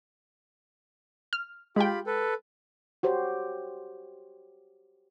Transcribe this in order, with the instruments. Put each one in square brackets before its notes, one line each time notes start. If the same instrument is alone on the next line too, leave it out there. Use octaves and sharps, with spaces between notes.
[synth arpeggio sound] F6
[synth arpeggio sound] G#3 G5 [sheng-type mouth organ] F4 G4 B5
[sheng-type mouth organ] A4 B4
[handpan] F#4 G4 C5 C#5